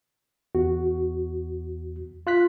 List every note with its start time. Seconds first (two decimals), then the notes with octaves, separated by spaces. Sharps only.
0.55 E2 F#4
2.27 F4 F#6 B6